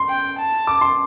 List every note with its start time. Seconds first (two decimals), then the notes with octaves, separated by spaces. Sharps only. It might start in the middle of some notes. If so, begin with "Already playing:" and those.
Already playing: C6
0.09 G5
0.38 A5
0.67 D6
0.81 C6